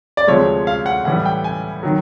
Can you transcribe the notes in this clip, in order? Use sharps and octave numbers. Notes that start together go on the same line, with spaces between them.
D5
D2 C3 F3 G#3 C#5
F5
F#5
A2 E3 G3 F#5
G5
G#5
D#3 F#3